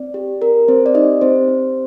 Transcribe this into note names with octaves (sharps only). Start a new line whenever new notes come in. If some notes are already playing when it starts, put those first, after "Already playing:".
Already playing: C4 D5
G4
C4 A#4
C4 C5
D5
D#4 G4 D#5
C4 G4 C5
C4